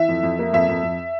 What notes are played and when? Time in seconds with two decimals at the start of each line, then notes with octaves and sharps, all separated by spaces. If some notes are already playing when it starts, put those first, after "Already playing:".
Already playing: E3 E5
0.09 F2
0.23 F2
0.39 A#3
0.54 F2 E5
0.69 F2
0.83 F2